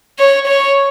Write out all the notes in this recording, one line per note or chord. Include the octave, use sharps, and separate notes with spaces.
C#5
C#5